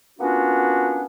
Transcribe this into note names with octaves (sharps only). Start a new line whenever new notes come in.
A#3 B3 C#4 D4 F4 F#4